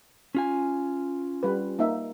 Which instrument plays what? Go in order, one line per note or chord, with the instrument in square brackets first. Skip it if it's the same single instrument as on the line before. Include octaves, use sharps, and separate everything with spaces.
[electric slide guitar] C#4 F4 G#5
[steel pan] G3 B4
A#3 D#4 E5